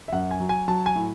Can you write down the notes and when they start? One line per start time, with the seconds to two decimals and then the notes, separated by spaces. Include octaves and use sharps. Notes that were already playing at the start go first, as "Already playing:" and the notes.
0.08 E5
0.13 F#2 F#5
0.31 G#5
0.40 F#3
0.49 G#5
0.68 F#3 A5
0.86 G#5
0.96 A2